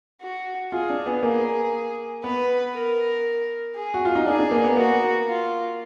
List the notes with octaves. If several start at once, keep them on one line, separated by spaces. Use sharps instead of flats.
F#4
F4 G#4
D4
B3
A#3 G#4
B3 B4
A#4
G#4
F#4
F4
D#4
D4 G#4
D4
A#3
B3
A#3 F#4
F4